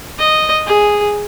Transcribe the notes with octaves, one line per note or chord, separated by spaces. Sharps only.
D#5
G#4